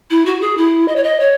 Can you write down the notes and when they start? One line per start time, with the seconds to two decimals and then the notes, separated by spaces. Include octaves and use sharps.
0.10 E4
0.26 F#4
0.41 G#4
0.57 E4
0.88 D#5
0.96 C#5
1.03 D#5
1.20 C#5